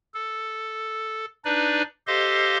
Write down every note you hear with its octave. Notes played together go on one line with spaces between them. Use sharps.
A4
D4 D#4 B4 D5
G4 A4 C5 D#5 F5 C6